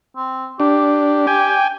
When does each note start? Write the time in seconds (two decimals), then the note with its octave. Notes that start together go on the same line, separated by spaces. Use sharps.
0.16 C4
0.60 D4 G4
1.27 G5 G#5